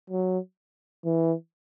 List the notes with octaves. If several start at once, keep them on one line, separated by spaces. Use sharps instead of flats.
F#3
E3